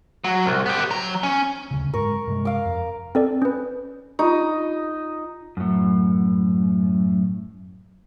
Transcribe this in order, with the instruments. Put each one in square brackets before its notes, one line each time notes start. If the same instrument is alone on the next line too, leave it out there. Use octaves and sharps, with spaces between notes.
[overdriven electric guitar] F#3
C2
B3 G4
F#3 A#5
C#4
[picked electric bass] D#1 D2 C#3
[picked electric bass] F#1 G#2 G#3 [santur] A#4 C#6
[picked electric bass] G2 C3 G#3
[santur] F5 D6
[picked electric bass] F2
[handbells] C4 A4 D5
C#4 B4
[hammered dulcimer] D#4 [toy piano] F4 G4
[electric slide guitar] F#2 A2